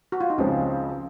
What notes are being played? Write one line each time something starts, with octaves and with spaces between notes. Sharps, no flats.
F#4
F4
D#4
C#2 C#3 F3 G#3 C4 C#4